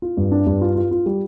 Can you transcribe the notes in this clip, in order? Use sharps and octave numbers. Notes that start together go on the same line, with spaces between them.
F4
G2
D4
G2
F4
F4
F4
G3